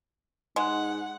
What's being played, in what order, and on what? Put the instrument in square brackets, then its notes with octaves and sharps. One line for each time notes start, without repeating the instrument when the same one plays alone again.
[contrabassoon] G#2 [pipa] G#3 [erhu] F#5